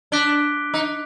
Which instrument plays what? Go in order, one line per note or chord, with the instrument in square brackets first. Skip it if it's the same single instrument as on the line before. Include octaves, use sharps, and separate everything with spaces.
[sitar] D4 [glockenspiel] D6 F#6 B6 D7 G7
[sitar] D#4